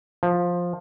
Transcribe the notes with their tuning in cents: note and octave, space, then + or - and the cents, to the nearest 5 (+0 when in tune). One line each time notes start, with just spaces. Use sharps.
F3 +10